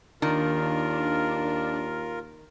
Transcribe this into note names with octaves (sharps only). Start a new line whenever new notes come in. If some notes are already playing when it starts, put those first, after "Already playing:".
D#2 D#3 D4 F4 A#4